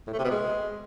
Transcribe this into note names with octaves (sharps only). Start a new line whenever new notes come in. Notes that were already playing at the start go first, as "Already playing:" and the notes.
A2
A3
C3
B2
G#3